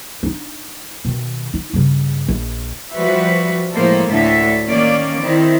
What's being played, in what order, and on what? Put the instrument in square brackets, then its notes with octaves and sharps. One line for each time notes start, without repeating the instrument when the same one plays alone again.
[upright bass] D4 D#4
B2 D#3
D#4
G2 C#3
A#1
[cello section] F3 G3 F#4 B4 E5
A2 F3 G#3 A#3 A4 C5
D2 A2 D3 A4 E5
D#3 A#3 C#4 D5
D#3 C4 E4